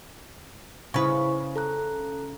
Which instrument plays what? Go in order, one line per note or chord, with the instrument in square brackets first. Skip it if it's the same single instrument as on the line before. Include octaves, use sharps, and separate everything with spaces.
[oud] C#3 B4 [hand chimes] E4 C5 C#6
[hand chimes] A4 A#5 F#6